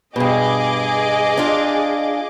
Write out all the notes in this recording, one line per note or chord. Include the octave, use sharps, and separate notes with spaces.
G2 B2 G#4 D#5 D6
D4 F4